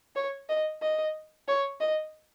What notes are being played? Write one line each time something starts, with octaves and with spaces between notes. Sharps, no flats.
C#5
D#5
D#5
C#5
D#5